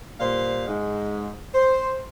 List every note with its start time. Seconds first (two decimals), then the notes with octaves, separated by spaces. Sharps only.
0.20 A#2 G3 C5 F5
0.67 G#2 G#3
1.55 C5